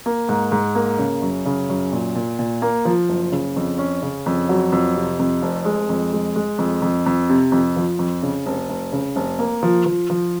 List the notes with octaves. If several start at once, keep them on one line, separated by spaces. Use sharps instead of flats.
A#3
G#2
G#2
A#3
C#3
F#2
C#3
F#2
A#2
A#2
A#2
A#3
F3
F#1
C#3
F2
C#4
C#3
F2
F#3
F2
C3
F2
F1
G#3
F2
G#3
G#3
F2
F2
F2
C3
F2
F3
F2
C#3
F1
F1
C#3
F1
A#3
F3
F3
F3